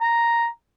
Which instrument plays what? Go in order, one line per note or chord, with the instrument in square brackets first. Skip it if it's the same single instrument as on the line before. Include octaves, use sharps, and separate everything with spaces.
[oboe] A#5